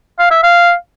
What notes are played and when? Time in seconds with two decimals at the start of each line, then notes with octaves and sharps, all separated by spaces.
0.19 F5
0.30 E5
0.43 F5